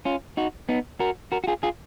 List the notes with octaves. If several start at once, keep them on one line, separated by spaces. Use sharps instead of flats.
C#4 F4
D#4 F#4
B3 D#4
F#4 A#4
F#4 A#4
F#4
F4 G#4
F4 G#4